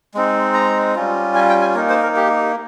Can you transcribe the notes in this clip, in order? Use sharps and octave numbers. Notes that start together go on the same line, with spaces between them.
G#3 C4 D#4
A#5
G3 C#4 F4
G#5
G5
G#5
A#3 D#4 A#4
C5
A#4
G4